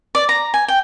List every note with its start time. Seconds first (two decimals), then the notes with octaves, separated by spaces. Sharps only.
0.15 D5
0.29 A#5
0.54 G#5
0.68 G5